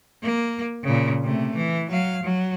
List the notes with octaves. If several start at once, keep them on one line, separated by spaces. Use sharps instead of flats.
A#3
A#2 C#3
C3 A3
E3
F#3 F5
F#3